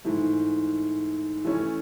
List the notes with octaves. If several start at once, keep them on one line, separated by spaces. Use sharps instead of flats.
G#2 E3 A3
E3 A3 C#4